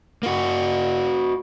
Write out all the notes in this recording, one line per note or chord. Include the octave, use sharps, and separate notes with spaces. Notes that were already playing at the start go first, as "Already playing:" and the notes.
A#3 F#4